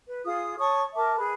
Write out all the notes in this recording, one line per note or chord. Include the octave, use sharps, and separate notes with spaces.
B4
F4 G#4 D#6
C#5 A5 C#6 D#6
A#4 E5 A5 D6
G#4 B4